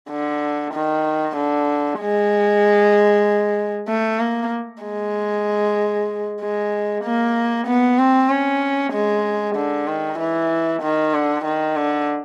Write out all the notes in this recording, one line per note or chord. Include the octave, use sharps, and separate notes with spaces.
D3
D#3
D3
G#3
A3
A#3
G#3
G#3
A#3
B3
C4
C#4
G#3
D3
D#3
E3
D#3
D3
D#3
D3